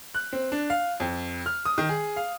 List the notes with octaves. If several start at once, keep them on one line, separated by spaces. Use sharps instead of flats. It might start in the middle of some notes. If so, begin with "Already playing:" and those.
F#6
C4
D4
F5
F2
F6
D#6
D#3
G#4
F5